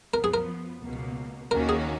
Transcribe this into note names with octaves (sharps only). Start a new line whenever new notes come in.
F#2 F3 B3 A#4
G#4
A#4
C#2 B2 A#3
D#2 D#3 A#3 C#4 F#4 A#4
G#4